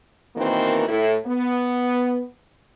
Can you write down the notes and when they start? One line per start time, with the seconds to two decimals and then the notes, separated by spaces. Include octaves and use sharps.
0.36 B2 D#3 E3 A#3 C4
0.88 A2 E4
1.25 B3